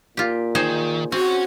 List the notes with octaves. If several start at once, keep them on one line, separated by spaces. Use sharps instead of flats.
A#2 F4 G4
D#3 D#4 G#4 C5
C4 C#4 F#4 C#5